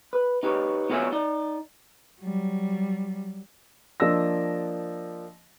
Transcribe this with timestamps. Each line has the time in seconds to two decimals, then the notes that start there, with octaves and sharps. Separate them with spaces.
0.13 B4
0.43 D#4 G4 B4 C#5
0.90 B3 F4 F#4 G#4 C#5 E5
1.12 D#4 D5
2.21 F#3 G3
4.00 F3 A#3 D4 D#5 E6 A#6